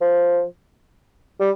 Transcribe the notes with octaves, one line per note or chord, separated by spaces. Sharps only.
F3
G3